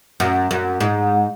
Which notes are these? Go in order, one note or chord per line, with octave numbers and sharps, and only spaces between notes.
F#2
F#2
G#2